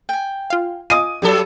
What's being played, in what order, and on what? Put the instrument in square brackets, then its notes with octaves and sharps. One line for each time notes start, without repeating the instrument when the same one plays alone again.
[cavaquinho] G5 G#5
[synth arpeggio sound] F4 F5
[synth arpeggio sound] F4 D#5 [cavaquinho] G#5 D6 [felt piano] D#6 D#7
[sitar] G2 F#3 A4 [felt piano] G4 [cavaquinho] D5